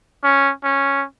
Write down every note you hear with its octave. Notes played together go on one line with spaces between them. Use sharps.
C#4
C#4